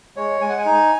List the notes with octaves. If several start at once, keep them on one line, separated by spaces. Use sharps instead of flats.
G#3 C#5
G#3 G#5
F#5
G#5
D#4